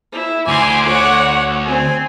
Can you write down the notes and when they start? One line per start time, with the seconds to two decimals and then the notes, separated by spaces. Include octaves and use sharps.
0.12 E4
0.48 D2 G#5 C6 D6
0.86 C#5 F#5
1.66 C4 G#5